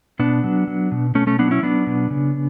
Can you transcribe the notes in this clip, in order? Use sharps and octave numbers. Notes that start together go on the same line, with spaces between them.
B2 B3 D4
F#3
F#3
B2
B2 A3 C#4
A3 C#4
F#3 B3 D4
C#4 E4
F#3 B3 D4
B2
C#3